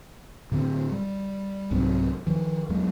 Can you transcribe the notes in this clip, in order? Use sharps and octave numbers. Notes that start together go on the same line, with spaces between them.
A2 D3 C4
G3
C2 G#2 F#3 C4
D#3 F3
E2 F#3 G#3